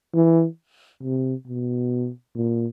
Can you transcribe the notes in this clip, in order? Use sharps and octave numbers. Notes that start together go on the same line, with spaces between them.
E3
C3
B2
A#2